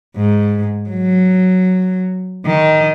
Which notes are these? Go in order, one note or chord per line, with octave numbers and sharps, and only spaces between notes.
G#2
F#3
D#3